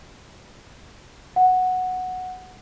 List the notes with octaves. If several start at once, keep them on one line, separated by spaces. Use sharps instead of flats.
F#5